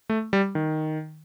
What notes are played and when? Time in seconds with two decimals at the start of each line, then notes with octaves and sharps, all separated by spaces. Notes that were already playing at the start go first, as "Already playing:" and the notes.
0.10 A3
0.33 G3
0.55 D#3